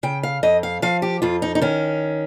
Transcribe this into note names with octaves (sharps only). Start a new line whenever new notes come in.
C#3 G5
F5
F2 D#5
F5
F3 F5
G4
F2 F4
D#4
D#4
D#3 C#4